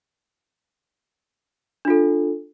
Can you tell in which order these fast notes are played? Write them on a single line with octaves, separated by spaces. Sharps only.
D4 F4 A4